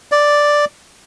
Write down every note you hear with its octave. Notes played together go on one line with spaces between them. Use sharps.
D5